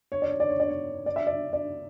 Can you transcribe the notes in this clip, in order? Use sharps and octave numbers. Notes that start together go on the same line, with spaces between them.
C#5
D5
C#5
D5
C#5
D5
C#5
D5
E5
D5
D5